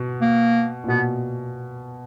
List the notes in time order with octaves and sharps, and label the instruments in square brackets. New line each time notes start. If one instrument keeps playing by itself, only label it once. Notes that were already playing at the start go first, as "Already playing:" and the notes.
Already playing: [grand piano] B2
[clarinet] A#3
[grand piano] A#2
[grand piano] B2 [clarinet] B3